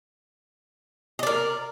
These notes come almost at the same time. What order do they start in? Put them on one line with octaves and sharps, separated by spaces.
D#5 D5 A#4